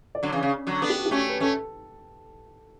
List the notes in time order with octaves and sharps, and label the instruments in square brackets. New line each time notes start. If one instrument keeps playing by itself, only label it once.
[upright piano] D5
[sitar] D3 F#3 [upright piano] C#5
[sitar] C#3 E3
C#3
D3 F#3
[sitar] B3 D4 [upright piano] A4
[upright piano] G4
F#4
G4
[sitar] A3 C#4
[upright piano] B4
[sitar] A3 C#4 [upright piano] A4